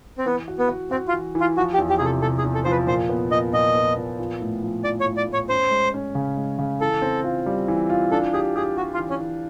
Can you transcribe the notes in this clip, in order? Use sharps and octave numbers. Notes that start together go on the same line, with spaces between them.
C4
E3 B3
F#4
B3
F#4
C4 F#4
F4
E3
E3
F4
F3 F#4
G4
E2
G4
C3 G#4
A4
C3 A4
G#4
E2
A4
F3 C5
B4
A#2 C5
B3
A#2 D#5
A#2 D#5
B3
A#2
F3
A2
F3
F3 D5
C#5
A2
D5
A2
C#5
C#4 C5
G#3
C#4
C#3
G#3
C#3
E3 A4
C4
F4
G3
E3
F4
D4 A4
G4 G#4
G4 G#4
F#4 G4
F4
E3
C#4
E3